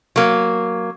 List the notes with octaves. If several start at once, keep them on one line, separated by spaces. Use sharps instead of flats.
F#3 A#3